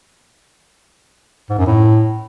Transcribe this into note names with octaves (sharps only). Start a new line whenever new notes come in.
G#2
F#2
A2